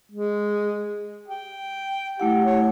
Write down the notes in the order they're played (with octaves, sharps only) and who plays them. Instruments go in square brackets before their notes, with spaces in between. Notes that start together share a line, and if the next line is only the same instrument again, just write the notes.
[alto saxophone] G#3
G5
[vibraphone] A3 E4 F#5 [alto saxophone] G4
[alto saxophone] C#5